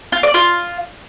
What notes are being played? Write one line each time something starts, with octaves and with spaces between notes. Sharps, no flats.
F4
D5
F4